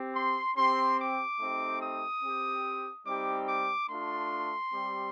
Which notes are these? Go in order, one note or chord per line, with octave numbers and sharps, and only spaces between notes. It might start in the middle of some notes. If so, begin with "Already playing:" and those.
Already playing: C4 G4
C6
C4 G4 C6
D6
A3 C4 D#4 G4
D#6
C4 G4
G3 C4 D#4 G4 D6
D6
A3 D4 F4 C6
G3 C4 G4